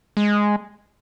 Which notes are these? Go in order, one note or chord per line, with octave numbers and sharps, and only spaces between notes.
G#3